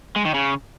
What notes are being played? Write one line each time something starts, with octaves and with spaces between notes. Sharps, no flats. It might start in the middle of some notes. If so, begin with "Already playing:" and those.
G#3
D#3
C#3